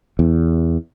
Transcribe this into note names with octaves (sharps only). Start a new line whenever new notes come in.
E2